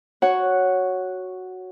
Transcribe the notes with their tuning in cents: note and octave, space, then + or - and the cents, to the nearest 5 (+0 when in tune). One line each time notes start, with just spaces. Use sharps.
F#4 +0 C#5 +0 F#5 +0